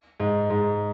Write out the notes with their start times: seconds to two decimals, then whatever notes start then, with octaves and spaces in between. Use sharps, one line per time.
0.20 G#2
0.50 G#2